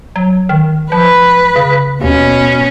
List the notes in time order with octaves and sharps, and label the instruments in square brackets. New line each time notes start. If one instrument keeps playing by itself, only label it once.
[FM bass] F#3
D#3
[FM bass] F3 [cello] B4
[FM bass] C#3
[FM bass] D#2 [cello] B2 C#4